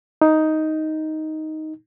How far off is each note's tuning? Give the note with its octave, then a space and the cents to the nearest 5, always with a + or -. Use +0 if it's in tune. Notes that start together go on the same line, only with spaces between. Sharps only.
D#4 +5